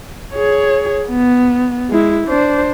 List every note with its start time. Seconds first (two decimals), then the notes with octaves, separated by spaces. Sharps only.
0.33 G#4 C#5
1.09 B3
1.90 G#3 E4
2.28 D4 C5